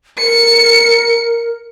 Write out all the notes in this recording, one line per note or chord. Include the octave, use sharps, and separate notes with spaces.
A#4 C#7